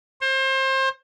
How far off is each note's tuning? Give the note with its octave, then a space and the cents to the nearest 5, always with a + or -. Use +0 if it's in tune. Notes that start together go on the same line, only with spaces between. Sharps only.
C5 +30